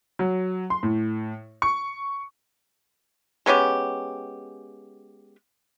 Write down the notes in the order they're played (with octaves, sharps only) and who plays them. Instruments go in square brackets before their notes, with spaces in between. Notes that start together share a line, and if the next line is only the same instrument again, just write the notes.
[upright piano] F#3
C6
A2
C#6
[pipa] G#3 B3 C#4 G4